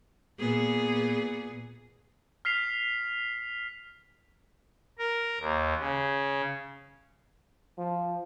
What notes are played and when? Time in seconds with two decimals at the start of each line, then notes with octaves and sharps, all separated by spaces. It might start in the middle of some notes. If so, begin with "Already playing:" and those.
0.39 A#2 B3 G#4
2.45 F6 B6 C7 F7
4.99 A#4
5.40 D#2
5.79 C#3
7.78 F3